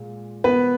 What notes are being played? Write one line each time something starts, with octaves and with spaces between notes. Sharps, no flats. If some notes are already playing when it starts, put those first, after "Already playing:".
Already playing: A#2 G#3
B3 B4